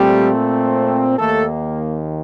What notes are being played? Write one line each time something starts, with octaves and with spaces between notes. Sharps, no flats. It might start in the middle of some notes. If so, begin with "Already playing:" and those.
Already playing: A#2 G3 A3 C4 G4
D#2 D#3 A3 A#3 A4